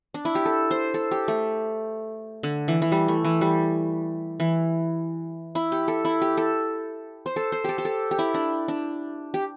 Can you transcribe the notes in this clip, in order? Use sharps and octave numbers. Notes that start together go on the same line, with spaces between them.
D4
E4
G4
A4
C5
A4
G4
A3
D3
E3
E3
G3
A3
E3
G3
E3
E4
G4
A4
E4
G4
A4
C5
A4
C5
G4 A4
G4
A4
G4
E4
D4
D4
G4